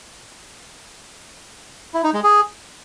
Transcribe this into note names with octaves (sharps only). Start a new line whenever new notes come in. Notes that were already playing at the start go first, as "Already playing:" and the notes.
E4
D#4
G#3
G#4